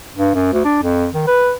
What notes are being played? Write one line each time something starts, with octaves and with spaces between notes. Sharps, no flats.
G2
F#2
D2
D4
F2
D#3
B4